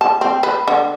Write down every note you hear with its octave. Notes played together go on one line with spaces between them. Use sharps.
A5
C4
B4
D3